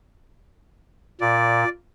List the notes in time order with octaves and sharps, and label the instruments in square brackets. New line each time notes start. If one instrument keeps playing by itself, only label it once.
[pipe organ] A#2 [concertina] D5